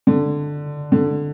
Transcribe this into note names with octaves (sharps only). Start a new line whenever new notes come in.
D3
D3